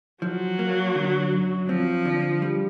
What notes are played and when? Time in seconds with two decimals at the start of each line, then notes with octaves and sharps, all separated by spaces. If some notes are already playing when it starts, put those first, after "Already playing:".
0.22 F3 F#3
0.59 A#3
0.95 D3
1.32 F#2
1.69 F3 C4
2.05 D3
2.42 G3